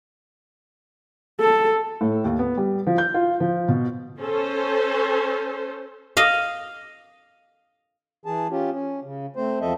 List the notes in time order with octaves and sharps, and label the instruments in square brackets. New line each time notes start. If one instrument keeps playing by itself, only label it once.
[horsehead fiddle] A4
[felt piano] A2
D#2
B3
G3
F3
G6
F4
F3
B2
[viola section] C#4 A4 C5
[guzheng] D#5 F5
[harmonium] E3 G#4 A5
C#4 F4 G4
C#4
C#3
A3 C4 C5
E2 F3 C4 A4 D#5 E5